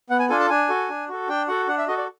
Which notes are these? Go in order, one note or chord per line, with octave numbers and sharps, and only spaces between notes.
B3 F#5
G#5
D4 F4 A4 G#5
A5
D4 G#5
F#4 A4
D4
F#4 A4
D4 G5
F#4 A4 F#5
D4 F#5
E5
F#4 A4 D#5
D5